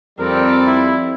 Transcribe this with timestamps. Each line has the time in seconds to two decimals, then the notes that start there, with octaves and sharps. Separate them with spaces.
0.19 F2 G3 C4 A4 A#4 D5
0.67 E4